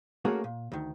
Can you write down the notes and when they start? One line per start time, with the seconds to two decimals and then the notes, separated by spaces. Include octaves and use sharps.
0.25 A3 A#3 C#4 F#4 G#4 A#4
0.44 A#2
0.72 D2 D#3